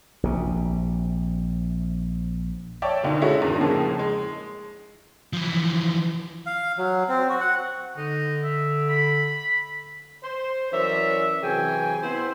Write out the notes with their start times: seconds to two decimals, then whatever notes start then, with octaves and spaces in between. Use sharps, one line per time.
0.23 A#1 C3
2.82 C#5 D5 E5 G5 A5 C#6
3.03 D2 B2 D#3 F4
3.21 G#3 A3 C#4 E4 F#4 E5
3.42 E2 G2 A#2 D3 D#3
3.61 A2 C#3 F3 G#3 A#3
3.99 G#3
5.33 E3 F3
6.46 F5
6.78 F#3
7.09 C4
7.29 F#4
7.41 F#5
7.97 D3 D#4
8.43 E5
8.89 B5
10.24 C5
10.72 E3 F#3 C#4 A#4 D5 E5
11.43 C3 E3 F#3 G#4 G5 G#5
12.03 B3 C4 E4 C5